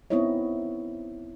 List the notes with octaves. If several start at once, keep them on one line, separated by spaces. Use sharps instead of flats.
B3 C4 D#4 E4 C#5 D#5